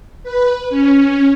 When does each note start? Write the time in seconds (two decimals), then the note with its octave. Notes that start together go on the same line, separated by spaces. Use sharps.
0.23 B4
0.70 C#4